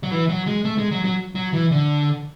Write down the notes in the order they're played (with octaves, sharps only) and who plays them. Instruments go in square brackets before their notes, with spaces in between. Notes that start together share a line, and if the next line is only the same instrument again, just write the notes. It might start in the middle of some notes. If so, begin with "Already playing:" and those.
[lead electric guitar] F#3
E3
F#3
G#3
A3
G#3
F#3
F#3
F#3
E3
D3